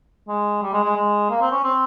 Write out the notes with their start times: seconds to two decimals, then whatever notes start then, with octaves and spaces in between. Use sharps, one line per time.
0.28 G#3
0.62 G3
0.73 G#3
0.84 G#3
0.96 G#3
1.30 A#3
1.41 C4
1.52 C#4
1.64 C4